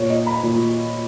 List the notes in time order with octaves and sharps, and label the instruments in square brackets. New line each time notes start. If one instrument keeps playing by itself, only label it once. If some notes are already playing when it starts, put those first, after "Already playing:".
Already playing: [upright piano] A#2 C#5
D#5
B5
A#2